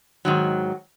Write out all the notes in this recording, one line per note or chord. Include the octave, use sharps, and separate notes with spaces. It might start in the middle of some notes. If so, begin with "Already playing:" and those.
G#2 D#3 F#3